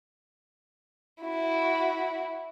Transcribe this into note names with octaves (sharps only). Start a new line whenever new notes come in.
E4 F#4